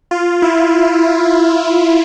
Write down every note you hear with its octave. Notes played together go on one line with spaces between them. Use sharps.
F4
E4